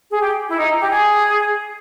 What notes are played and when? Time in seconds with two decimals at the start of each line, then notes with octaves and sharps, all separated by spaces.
0.09 G#4
0.22 G4
0.49 E4
0.59 D#4
0.79 G4
0.89 G#4